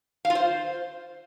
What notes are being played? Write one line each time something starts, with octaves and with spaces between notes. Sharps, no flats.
F5
F4
C5